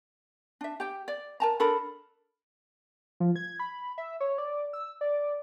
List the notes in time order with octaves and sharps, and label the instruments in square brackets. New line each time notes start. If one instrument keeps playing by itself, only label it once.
[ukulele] D4 E5
G4 G5
D5
A#4 A5 A#5
D4 A4 A#4 B5
[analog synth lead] F3
G#6
B5
E5
C#5
D5
E6
D5